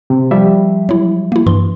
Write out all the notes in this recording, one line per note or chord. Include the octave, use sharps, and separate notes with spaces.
C3
F3 G3 E5
F#3 E4
A#3 E4
G2 E3 C6